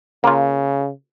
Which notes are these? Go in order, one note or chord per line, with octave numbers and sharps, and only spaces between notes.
C#3 A#3 F4